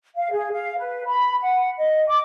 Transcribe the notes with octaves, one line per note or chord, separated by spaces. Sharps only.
F5
G#4
F5
B4
B5
F#5
D#5
D6